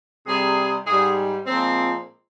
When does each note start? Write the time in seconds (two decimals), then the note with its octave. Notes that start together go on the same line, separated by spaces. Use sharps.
0.26 C3 G3 G#4
0.87 G#2 G3 G#4
1.47 A#2 F3 G#3 C4